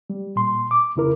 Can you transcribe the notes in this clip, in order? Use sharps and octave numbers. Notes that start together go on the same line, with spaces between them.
G3
A#2 C6
D6
F2 C#3 E4 A#4